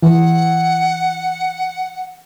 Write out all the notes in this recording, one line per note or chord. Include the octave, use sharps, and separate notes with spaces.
E3 F#5